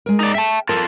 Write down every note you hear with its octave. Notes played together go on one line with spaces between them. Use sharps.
G#3 A#4
D#4 D5
E5 G5 A5
F4 A4 A#4